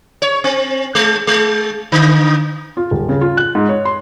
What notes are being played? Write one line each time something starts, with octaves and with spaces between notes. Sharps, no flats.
C#5
C4
G#3
G#3
D3
F4
D#1
C#3
F4
F#6
G#2
C#5
C6